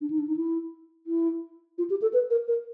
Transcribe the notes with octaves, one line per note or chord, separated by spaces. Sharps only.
D4
D#4
D4
D#4
E4
E4
F4
G4
A4
B4
A#4
A#4